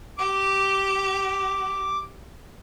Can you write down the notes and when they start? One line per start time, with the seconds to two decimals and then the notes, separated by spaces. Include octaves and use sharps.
0.18 G4 D6